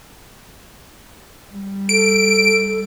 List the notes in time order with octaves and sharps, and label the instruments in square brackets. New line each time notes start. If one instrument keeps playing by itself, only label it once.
[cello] G3
[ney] A4 [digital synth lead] D7